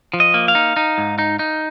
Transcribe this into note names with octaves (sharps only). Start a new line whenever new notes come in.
F3
D#5
A#3
F5
D#4
D#4
G#2
D#4
D#4